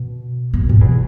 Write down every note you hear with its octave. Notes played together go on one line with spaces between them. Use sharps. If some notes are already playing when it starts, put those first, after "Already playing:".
Already playing: B2
B2
G#2
E2